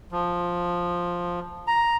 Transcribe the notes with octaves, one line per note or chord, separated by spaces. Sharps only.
F3
A#5